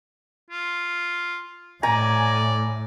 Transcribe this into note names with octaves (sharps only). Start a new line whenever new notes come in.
F4
A2 D5 G#5 A#5